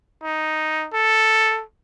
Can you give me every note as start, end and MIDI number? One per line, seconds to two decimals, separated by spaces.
0.24 0.88 63
0.93 1.63 69